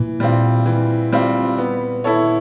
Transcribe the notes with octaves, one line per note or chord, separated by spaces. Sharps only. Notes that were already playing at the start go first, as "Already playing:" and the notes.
Already playing: A#2 E3
G3 C4 F4
E3
G3 C4 F4
B3
E4 A4 C#5